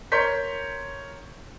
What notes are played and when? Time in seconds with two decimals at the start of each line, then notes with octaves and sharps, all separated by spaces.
0.12 A#4 C#5 C6 G6 B6